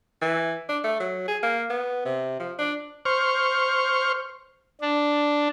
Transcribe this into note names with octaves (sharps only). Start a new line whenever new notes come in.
E3
D4
A3
F#3
G#4
A#3
B3
C3
F3
D4
C5 C#6 F6
D4